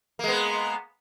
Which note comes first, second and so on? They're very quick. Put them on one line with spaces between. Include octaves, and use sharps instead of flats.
A#3 G#3 B3